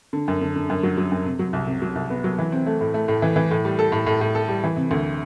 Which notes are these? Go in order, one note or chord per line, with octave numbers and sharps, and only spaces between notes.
D3
F#2
D3
D3
F#2
F#3
F#3
F#2
C3
F#3
C2
C3
F#3
C2
B3
F#3
E3
C4
A3
A2
A3
A2
E3
E3
A2
G3
A4
A2
A2
A2
A4
G3
E3
C3
D2